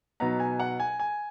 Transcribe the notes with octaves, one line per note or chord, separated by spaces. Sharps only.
B2 F#3 B3 D#4 A#5
G#5
F#5
G#5
G#5